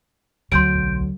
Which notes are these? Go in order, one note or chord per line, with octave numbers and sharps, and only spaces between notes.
D2 F#3 C6 G6 D7
B1